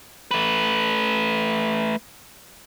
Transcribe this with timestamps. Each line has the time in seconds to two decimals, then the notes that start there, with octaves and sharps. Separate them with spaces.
0.31 A3 B4